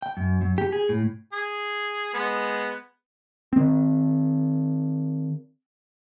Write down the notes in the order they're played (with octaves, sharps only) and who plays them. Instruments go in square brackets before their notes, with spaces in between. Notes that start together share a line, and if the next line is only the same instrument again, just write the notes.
[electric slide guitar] G5
F#2
F#2
G4
G#4
A2
[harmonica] G#4
G#3 B3
[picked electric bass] D#3 C4